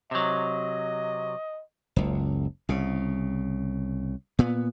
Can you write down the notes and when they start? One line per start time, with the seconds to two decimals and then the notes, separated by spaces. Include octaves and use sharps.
0.11 C3 F#3 D#5
1.96 F#1 C#2
2.69 C2 C#3
4.39 A#2 B3